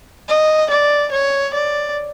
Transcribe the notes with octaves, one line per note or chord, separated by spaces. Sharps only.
D#5
D5
C#5
D5